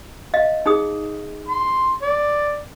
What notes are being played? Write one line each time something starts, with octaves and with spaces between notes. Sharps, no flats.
D#5 F5
D#4 G#4 D#6
C6
D5